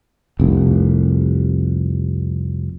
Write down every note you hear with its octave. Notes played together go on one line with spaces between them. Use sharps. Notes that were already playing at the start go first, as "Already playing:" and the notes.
F1 C2